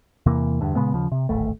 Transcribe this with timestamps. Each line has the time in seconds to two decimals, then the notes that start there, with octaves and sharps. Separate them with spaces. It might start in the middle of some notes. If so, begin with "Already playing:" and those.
0.26 E2 C3 E3 A#3
0.61 E2 G2 D3
0.76 A#2 C#3 G#3 B3
0.94 D#2 C#3 F3
1.12 C3
1.29 D1 G#1 A3